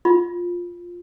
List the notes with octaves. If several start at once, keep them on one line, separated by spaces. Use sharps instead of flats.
F4